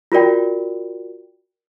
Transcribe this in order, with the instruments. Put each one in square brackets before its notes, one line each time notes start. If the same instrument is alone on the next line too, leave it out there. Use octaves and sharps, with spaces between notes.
[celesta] F4 F#4 A#4 D5 G5